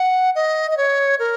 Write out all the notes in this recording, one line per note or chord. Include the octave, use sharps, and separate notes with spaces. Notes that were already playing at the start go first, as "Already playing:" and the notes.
Already playing: F#5
D#5
D#5
C#5
A#4